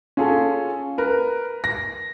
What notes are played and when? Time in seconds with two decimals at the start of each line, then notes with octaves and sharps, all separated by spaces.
0.17 C#4 F4 G#4 A4
0.98 A#4 B4
1.64 A#6